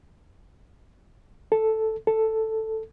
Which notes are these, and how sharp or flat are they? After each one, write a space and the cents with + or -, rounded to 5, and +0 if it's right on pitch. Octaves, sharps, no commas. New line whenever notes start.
A4 +0
A4 +5